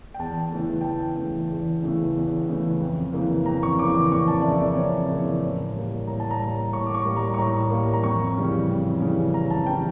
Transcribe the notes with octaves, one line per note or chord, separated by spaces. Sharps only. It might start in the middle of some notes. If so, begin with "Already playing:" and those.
G5
E2 A5
C#3 E3 A3
G5
E2 A5
C#3 E3 A3
E2
C#3 E3 A3
E2
C#3 E3 A3
F2
C#3 E3 A#3
F2 A#5
C#6
C#3 E3 A#3 D6
D6
F2 C#6
A5
D5
C#3 E3 A#3 E5
D5
F2 C#5
C#3 E3 A#3
A2
G3 A#3
A2 A#5
A5
A#5
G3 A#3
A2 C#6
D6
C#6
G3 A#3
A#5
C#6
A2 A#5
G3 A#3
A#5
F2 C#6
C#3 E3 G3 C#4
F2
C#3 E3 G3 C#4
F2 A#5
A5
C#3 E3 G3 C#4 G5